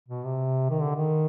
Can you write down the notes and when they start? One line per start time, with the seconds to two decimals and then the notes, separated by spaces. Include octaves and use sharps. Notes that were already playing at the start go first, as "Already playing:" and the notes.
0.09 B2
0.24 C3
0.70 D#3
0.82 D3
0.96 D#3